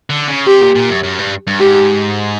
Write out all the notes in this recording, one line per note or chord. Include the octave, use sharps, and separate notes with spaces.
D3
C#3
C3 G4
A#2
A#2
F#2
F#2
G2
G2
G#2 G4